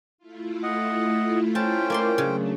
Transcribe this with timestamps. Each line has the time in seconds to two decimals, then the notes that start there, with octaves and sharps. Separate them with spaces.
0.18 A3 E4 F4
0.63 D#5 F#5
1.55 C#4 C5 G5 A5
1.90 A#3 D5 C6
2.18 C#3 F#3 A3 D4